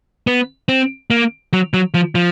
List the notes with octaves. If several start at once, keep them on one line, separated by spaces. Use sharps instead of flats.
B3
C4
A#3
F#3
F#3
F3
F3